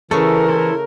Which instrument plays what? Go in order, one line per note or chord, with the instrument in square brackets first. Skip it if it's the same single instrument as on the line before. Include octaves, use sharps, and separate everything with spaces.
[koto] C#3 A3 [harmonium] E3 [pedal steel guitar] A4 E5 [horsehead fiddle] A#4
[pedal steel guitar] E4 A4 C5